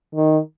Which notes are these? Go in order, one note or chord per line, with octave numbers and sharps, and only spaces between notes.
D#3